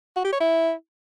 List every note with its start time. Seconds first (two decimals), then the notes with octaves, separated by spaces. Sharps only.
0.16 F#4
0.24 G4
0.32 C#5
0.40 E4